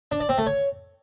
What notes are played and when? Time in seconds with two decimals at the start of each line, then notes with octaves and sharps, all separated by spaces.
0.12 D4
0.20 D5
0.29 C4
0.38 A3
0.47 C#5